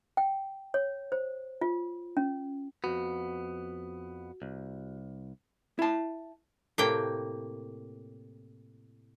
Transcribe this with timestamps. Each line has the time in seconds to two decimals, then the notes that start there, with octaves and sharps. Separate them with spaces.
0.17 G5
0.74 C#5
1.12 C5
1.61 F4
2.17 C#4
2.84 F2 B3 F#4
4.42 C2
5.79 E4 A5
6.78 A2 C3 A#3 G5